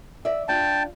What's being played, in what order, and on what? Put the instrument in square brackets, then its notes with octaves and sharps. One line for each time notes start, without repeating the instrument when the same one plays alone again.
[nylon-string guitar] D5 E5
[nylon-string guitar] D4 F4 [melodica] G5 A5